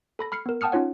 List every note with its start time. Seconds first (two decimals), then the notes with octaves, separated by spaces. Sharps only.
0.19 A4 B5 A#6
0.32 B5 F6 C7 C#7
0.46 B3 A#4
0.61 F#5 G5 A5 D#6 F6 C#7
0.72 C#4 D#4 F4 C#5 F#5